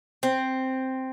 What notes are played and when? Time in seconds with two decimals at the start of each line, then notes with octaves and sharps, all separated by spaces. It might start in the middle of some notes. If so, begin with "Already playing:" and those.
0.23 C4